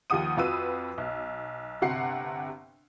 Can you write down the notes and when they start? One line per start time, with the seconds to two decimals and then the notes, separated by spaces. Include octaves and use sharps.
0.10 D#2 F3 G4 F#5 D#6 D#7
0.37 F2 F4 F#4 B4 E6 D#7
0.98 B1
1.82 G1 C3 F#5 C7